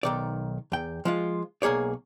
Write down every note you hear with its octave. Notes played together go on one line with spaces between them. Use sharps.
B1 D#3 D5
E2 G5
F3 G#3 F4
B1 A#3 G#4 C#5 D5